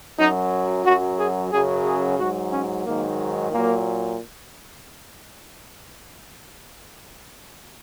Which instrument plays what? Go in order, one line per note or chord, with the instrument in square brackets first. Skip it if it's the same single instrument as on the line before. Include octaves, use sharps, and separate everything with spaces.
[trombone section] F#2 F#3 D#4
F#2 F#3 F#4
G#4
F#2 C#3 F#3 G#4
G#4
G#2 F#3 F#4
C#4
G#2 D#3 F#3 A#3
A#2 F#3 A#3